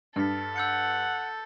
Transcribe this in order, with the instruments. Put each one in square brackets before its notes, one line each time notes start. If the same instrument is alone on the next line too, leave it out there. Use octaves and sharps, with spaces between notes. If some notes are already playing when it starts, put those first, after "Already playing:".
[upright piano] G2 [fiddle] A4 [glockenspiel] F6 B6
[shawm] F#5 [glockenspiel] E6 G6 C#7